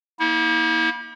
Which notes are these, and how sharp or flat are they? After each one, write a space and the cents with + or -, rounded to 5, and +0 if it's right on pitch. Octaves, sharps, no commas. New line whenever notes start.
A#3 +35 E4 -40